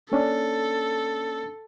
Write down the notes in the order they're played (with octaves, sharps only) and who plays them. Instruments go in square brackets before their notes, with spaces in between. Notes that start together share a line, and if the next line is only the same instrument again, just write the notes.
[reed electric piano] A#3 C#4 D4 [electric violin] A4